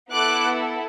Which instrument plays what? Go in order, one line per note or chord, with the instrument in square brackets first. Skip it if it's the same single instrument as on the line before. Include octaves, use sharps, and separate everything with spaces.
[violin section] B3 E4 A4 D6 F#6